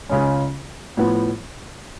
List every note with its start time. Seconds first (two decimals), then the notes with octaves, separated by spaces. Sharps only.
0.09 C#2 C#3 G#3 C#4
0.97 A2 F3 B3